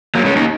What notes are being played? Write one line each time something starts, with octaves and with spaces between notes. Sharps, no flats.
F#3 A#3
G#3 C#4
A#3 D#4